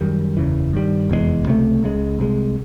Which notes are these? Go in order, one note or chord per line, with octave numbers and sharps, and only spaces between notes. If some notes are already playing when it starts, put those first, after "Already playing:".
F#2 D#3 G3
F#1 E2 C#3 E3
G2 D#3 G3
F1 E2 B2 G#3
C#2 C3 F3 A3
C#2 C#3 F3 G#3
C2 C3 E3 G#3